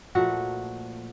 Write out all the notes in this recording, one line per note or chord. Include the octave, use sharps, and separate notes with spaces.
A#2 F3 A3 F#4